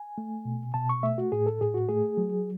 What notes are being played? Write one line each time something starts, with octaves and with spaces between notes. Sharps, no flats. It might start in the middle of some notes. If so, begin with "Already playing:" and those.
Already playing: G#5
A3
B2
B2 A5
C#6
A3 E5
F#4
A2 G#4
A4
A2 G#4
F#4
A3 G#4
F#3